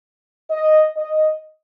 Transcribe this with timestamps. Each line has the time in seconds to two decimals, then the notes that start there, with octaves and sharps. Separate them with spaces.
0.51 D#5
0.97 D#5